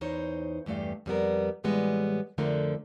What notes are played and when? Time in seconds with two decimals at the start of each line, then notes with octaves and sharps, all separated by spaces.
0.01 E2 D#4 C5 C#5
0.66 E2 G2 A3 G4 F5
1.06 F2 G3 B3 A#4
1.64 A2 E3 G3 G#3 B3
2.38 F2 D3 F3 A3 A#4